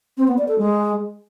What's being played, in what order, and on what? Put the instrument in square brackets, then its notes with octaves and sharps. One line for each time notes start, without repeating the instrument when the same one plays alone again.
[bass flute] C4
B3
D5
A4
G#3